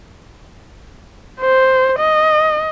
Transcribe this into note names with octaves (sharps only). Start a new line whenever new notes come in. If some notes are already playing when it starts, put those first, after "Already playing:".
C5
D#5